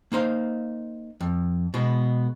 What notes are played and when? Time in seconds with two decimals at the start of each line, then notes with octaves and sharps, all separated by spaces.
0.12 A#3 D#4 C5 F5
1.20 F2
1.74 B2 G#3 B3